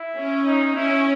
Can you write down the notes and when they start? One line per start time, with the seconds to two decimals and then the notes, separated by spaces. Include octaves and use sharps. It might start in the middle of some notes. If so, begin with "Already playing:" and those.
Already playing: E4
0.16 C#4
0.45 D#4
0.75 C#4 E4